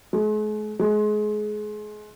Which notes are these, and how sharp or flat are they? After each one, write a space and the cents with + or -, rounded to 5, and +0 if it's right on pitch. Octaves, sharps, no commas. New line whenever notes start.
G#3 +45
G#3 +30